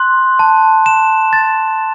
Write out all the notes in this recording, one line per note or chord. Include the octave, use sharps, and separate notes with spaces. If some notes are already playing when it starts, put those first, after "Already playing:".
Already playing: C6 F#6
A5
E7
A6